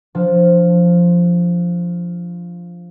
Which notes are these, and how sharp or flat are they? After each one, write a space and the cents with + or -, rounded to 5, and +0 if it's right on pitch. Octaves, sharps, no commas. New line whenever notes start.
F3 +0 D4 +0